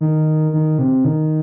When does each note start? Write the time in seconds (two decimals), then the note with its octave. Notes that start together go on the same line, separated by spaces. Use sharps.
0.01 D#3
0.53 D#3
0.79 C3
1.05 D#3